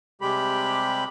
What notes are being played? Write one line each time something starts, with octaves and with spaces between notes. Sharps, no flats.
C3 G3 G#3 G4 B5